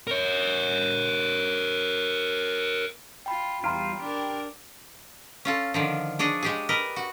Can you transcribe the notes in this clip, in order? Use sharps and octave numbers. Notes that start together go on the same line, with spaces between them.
A#4 C#5
F4 G5 B5
E2 G3 F4 A#5 C6 F6
D4 G4 A#4
C#4 F4 A4
D3 D#3 F3
D4 G#4 C#5 D#5
G#3 G4 G#4
A#4 B4 D#5
F#4